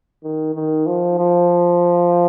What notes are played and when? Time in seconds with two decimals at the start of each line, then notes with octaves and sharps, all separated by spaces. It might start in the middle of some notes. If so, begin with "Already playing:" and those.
0.24 D#3
0.55 D#3
0.87 F3
1.19 F3